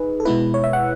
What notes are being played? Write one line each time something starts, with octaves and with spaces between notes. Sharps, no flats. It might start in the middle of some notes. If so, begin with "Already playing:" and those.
Already playing: D#4 G#4 B4
A4
B2 G#3 B3 E4 B4
C#5
E5
F#5